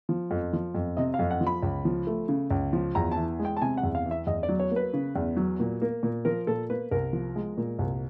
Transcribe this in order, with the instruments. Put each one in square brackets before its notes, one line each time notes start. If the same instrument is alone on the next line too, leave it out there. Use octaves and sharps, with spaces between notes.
[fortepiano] F3
F2
F3
F2
C3 D#5
F5
F2
F#5
F3
B5
C#2
F3
A3
C#3
C#2
F3
E2 A#5
E3 A5
G#3
G5
A5
C3 G#5
F#5
E2
F5
E3
E5
E2 D#5
D5
F#3
C#5
A#3 B4
C#3
E2
F#3
A#2
A#3
A#2
F3 A#4
A#2 A4
A#3 B4
C2 A#4
F3
G#3
A#2
C2